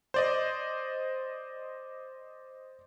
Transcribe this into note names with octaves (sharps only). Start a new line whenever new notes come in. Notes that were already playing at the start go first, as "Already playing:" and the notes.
C5 D5 D#5